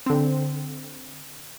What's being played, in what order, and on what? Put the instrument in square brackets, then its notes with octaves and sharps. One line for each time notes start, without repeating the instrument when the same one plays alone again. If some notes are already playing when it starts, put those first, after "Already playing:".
[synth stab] D3 C4